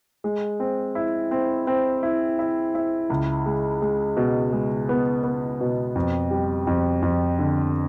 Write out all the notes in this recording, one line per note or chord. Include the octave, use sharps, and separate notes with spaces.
G#3
C4
E4
C4
C4
E4
E4
E4
C#2
G#3
G#3
B2
G#3
B3
B3
B2
F2
G3
F2
F2
D3